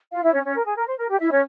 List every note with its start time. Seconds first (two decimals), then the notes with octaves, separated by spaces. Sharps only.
0.12 F4 F5
0.23 E4 E5
0.33 C#4 C#5
0.44 C#4 C#5
0.55 A#4
0.66 G#4
0.77 A#4
0.87 C5
0.98 A#4
1.09 G4
1.20 E4 E5
1.30 C#4 C#5